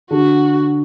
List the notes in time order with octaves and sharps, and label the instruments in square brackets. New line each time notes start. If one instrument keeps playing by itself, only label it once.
[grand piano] D3 [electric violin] F#4